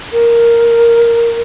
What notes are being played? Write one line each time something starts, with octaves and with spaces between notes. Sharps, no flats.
A#4